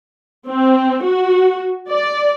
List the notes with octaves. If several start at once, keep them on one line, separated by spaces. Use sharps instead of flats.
C4
F#4
D5